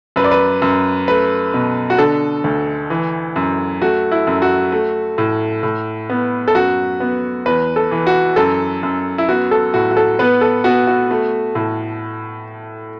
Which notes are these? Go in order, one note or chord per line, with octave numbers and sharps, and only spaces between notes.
F#2 B4
D5
B4
F#2
A3 B4
B2
F#4
D3 A4
D2
E3
F#2
A3 F#4
E4
F#2
F#4
A3
A2
A2
B3
A4
F#2 F#4
B3
E2 B4
A4
E3
F#4
F#2 A4
F#2
E4
B3 F#4
A4
A2 F#4
F#4
A4
B3 B4
A4
B3 F#4
F#4
A3
A2